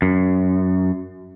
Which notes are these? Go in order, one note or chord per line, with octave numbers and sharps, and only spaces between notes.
F#2